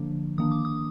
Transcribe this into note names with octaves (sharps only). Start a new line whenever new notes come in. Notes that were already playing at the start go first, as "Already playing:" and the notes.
Already playing: D3 F3 A#3 D4
D#3 A#3 D4 D#6
D6
D#6